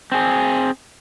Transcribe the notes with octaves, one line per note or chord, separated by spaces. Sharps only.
C4 G#4